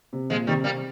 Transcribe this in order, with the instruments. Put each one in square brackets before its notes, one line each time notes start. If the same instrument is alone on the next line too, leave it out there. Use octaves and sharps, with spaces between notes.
[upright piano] C3
[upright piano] A#2 [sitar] F3 G#3
[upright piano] C3 [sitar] D#3 G3
[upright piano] C3 [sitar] G3 A#3